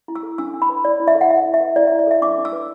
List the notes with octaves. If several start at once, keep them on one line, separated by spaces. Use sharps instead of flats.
E4
E6
A4
D4 E6
D4
B5
B4
E4 D5
E4
E5
A4
F#5
E4 E5
E4
E5
B4
E4 D5
E5
E4
D5
A4 E5
D4 D6
D4
E6
B4